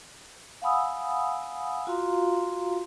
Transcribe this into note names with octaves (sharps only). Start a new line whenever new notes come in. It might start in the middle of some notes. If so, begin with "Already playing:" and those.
F5 F#5 G#5 B5 D#6 E6
F4 F#4 F5 A#5 C6